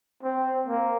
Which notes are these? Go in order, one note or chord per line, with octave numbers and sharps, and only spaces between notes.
C4
A#3